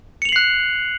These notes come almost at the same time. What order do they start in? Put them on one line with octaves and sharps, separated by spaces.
C#7 F7 F#7 C7 F#6